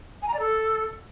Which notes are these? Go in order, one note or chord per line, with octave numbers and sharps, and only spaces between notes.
G#5
A#5
D5
A4